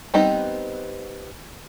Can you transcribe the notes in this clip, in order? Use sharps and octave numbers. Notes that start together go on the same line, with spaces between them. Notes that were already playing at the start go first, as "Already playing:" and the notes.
G3 B3 C4 D#4